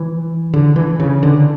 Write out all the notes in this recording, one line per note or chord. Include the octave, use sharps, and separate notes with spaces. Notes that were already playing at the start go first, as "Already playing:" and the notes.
Already playing: E3
D3
E3
C#3
D3